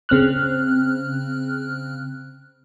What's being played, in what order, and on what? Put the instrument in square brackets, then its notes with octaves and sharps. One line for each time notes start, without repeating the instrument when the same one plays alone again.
[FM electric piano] C#3 C4 F6 F#6